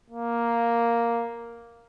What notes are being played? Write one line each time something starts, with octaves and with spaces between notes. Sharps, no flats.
A#3